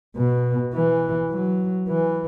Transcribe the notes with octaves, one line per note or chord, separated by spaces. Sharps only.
B2
E3
F#3
E3